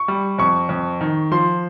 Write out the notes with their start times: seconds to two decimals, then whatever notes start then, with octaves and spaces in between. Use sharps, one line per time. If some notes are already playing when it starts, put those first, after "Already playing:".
Already playing: C#6
0.08 G3
0.38 F2 C#6
0.69 F2
1.01 D#3
1.31 F3 C6